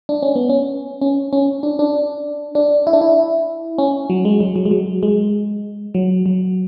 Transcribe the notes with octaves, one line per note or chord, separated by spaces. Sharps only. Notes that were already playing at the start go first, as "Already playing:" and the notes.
D4
C#4
B3
C#4
C#4
C#4
D4
D4
D4
E4
D4
E4
C#4
F#3
G#3
F#3
F#3
G#3
F#3
G#3
F#3
F#3